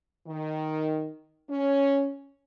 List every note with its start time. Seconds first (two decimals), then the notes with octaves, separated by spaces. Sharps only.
0.27 D#3
1.49 C#4